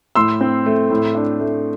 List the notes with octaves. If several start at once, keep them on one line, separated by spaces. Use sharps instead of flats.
A2 C6 E6
C4
A3
A2
D4
A3